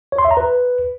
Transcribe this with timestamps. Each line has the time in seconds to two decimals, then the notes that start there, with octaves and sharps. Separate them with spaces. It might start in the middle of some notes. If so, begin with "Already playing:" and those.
0.12 C#5
0.18 C6
0.25 E5
0.31 A#5
0.37 B4